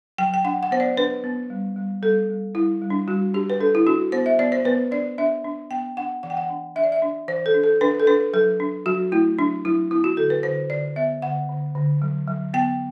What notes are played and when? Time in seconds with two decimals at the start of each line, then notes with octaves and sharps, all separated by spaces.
0.18 F#3 G5
0.34 G5
0.44 D4 F#5
0.63 F#5
0.71 B3 C5
0.80 D5
0.97 D4 B4
1.24 B3
1.50 G3
1.76 G3
2.02 G3 A4
2.29 G3
2.55 G3 E4
2.81 G3
2.90 D4
3.08 G3 F#4
3.34 D4 G4
3.50 B4
3.60 D4 A4
3.75 E4
3.86 D4 F#4
4.12 B3 C5
4.26 E5
4.39 B3 D5
4.52 C5
4.65 B3 B4
4.91 D4 D5
5.18 D4 E5
5.45 D4
5.70 B3 G5
5.97 D4 F#5
6.23 E3 F#5
6.30 G5
6.37 F#5
6.50 D4
6.76 D4 E5
6.84 D5
6.92 E5
7.02 D4
7.28 E3 C5
7.46 A4
7.54 D4
7.64 A4
7.81 D4 B4
8.00 A4
8.07 D4 B4
8.33 F#3 A4
8.60 D4
8.86 F#3 F#4
9.12 A3 E4
9.38 F#3 D4
9.65 F#3 E4
9.91 B3 E4
10.04 F#4
10.17 D3 A4
10.30 B4
10.43 D3 C5
10.70 D3 D5
10.96 B3 E5
11.22 D3 F#5
11.49 D3
11.75 D3
12.02 F#3
12.27 F#3
12.54 B3 G5